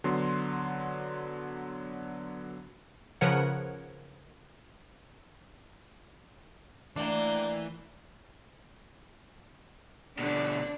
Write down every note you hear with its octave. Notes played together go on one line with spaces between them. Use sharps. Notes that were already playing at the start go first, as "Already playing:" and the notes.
D3 F#3 B3 C6
C#3 F3 A#4 B4 C#5 F#5
E3 A3 A#3 D4 D5 G5
B2 D3 D4